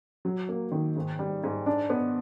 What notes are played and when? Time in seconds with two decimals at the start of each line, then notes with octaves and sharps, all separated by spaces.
0.25 F#3
0.49 A#3
0.72 D#3
0.96 G#2
1.19 G3
1.44 G#2
1.66 D4
1.90 B3